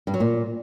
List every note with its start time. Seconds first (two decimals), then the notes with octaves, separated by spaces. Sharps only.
0.07 G2
0.14 F#3
0.20 A#2